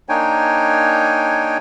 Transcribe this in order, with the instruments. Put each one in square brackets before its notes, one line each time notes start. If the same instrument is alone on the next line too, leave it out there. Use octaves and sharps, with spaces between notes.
[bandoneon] A#3 D4 D#4 C#5 G5 G#5